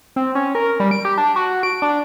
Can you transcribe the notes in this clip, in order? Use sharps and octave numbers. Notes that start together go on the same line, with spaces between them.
C4
C#4
A#4
G3
D7
G4
D4
F#4
D7
D4